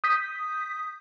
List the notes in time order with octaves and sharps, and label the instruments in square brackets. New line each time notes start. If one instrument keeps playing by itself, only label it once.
[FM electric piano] D#6 G6 B6